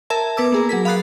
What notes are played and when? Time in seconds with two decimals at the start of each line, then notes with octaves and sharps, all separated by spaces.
0.10 A#4 E5 A5 G#6
0.37 B3 B4 D6 E6
0.52 A#3 G#4 A#4
0.69 F#3 G#4 A#4 B6
0.85 F5 B5 D#6 F#6 A6 C7